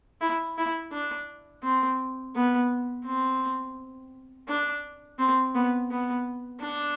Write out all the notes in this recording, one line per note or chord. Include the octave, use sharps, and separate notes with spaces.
E4
E4
D4
C4
B3
C4
D4
C4
B3
B3
D4